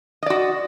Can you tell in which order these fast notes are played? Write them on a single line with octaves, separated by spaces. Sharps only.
D#5 D5 F#4